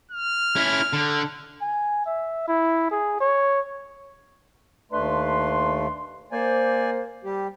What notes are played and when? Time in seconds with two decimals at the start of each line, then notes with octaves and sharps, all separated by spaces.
0.11 F6
0.56 C#4 E4
0.93 D3
1.61 G#5
2.06 E5
2.47 E4
2.91 G#4
3.20 C#5
4.92 D#2 A3 D4 B4 C6
6.32 A#3 C5 D5 G#5
7.24 G3 G4